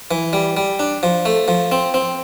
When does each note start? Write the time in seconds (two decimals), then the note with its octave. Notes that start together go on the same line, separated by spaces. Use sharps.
0.11 E3
0.33 G3
0.57 G3
0.79 D4
1.03 F3
1.25 A3
1.48 F3
1.72 C4
1.94 C4